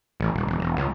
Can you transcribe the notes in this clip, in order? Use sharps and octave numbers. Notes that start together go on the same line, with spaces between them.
A1
D#1
E1
E1
C#2